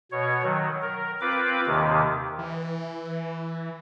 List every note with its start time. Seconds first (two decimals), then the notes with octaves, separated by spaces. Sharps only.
0.12 B2 C#5
0.43 D#3 F#3
0.82 A#4
1.21 C4 F4 B4 D6
1.66 D#2 C3 D#3
2.39 E3